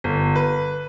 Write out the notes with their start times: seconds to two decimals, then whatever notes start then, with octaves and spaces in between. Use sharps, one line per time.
0.04 G1
0.35 B4